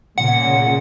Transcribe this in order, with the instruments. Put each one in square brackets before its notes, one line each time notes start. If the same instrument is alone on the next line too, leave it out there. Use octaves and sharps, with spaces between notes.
[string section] A#2 C#3 [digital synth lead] F#5